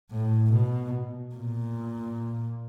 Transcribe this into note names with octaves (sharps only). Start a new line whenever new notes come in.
A2
B2
A#2